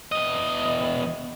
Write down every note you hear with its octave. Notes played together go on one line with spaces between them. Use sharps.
E2 D#5